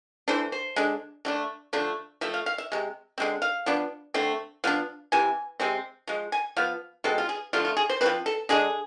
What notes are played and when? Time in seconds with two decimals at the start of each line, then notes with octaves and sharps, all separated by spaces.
0.28 E3 A3 D4 C5
0.52 C5
0.76 D3 G#3 D4
1.25 D3 A3 D4
1.73 D3 F3 A3 D4
2.21 F3 A3 E5
2.34 F5
2.46 F5
2.58 E5
2.72 C3 G#3
3.18 D3 G#3 C4
3.42 F5
3.66 F3 B3 D4
4.14 D3 A3 C4
4.64 F3 B3 D4 F5
5.12 C3 E3 G#5
5.60 C3 G#3 C4
6.07 F3 G#3
6.32 G#5
6.57 F3 B3 F5
7.04 B2 G#3 C4 A4
7.18 F4
7.29 G#4
7.53 D3 F3 A3 D4 F4
7.65 F4
7.77 G#4
7.89 C5
8.01 G#3 C4 B4
8.06 F3
8.26 A4
8.49 D3 G#3 D4 G#4